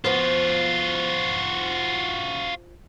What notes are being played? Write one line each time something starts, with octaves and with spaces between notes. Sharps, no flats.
F3 B3 F4 F#4